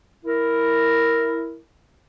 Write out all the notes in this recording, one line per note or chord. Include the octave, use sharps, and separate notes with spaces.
E4 A#4